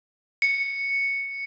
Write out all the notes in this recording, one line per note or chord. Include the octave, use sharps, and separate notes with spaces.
C#7